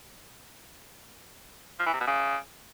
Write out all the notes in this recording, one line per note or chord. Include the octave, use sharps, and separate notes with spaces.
F3
E3
C3
B2
C#3